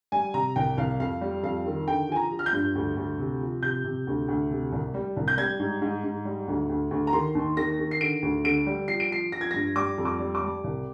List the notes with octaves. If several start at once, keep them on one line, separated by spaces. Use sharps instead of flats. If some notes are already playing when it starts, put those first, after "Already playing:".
G3 G#5
C3 A#5
C2 G5
C2 F5
F2 F5
G3
F2 F5
D#3
D3 G5
F3 G#5
A#5
F3
F6
G6
G2
D2
D2
C3
F3
C3 G6
C3
D2
D2
C3
C2
G3
C2
G6
G3 G#6
G#2
G#2
G#2
G3
D2
D2
D2
A#5
D#3 C6
D#2
D#3 A#6
D#3
C7
D3 D7
D2
D3 D7
G3
F3 C7
D7
F3 C7
F3 A#6
G#6
G2 A#6
G3 D6
F2
D6
G3
D6
G3
C2